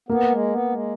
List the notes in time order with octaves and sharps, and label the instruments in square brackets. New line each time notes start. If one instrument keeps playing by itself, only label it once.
[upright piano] A#3 [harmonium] B3
[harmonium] G#3
B3
G#3